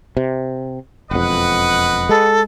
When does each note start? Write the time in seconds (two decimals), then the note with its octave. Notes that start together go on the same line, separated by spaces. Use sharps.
0.17 C3
1.11 E1 F2 B4 D#5 F#5
2.09 G#3 A4